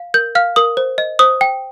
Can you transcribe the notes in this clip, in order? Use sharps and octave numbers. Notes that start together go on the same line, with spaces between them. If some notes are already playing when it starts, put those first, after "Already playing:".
Already playing: F5
A#4 G6
F5 F6
A#4 D#6
C5
D#5
C5 D#6
G5